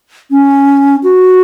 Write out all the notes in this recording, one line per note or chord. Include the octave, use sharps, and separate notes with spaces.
C#4
F#4